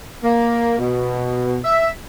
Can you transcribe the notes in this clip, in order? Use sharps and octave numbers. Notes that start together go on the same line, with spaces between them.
A#3
B2
E5